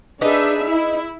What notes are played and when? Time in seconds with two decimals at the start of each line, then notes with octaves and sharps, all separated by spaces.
0.21 D4 D#4 G#4 B4 D#5 E5
0.68 E4